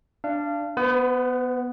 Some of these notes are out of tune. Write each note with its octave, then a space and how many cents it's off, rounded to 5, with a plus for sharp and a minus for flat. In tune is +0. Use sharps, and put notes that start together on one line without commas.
D4 +0 F5 -25
B3 +0 B4 +45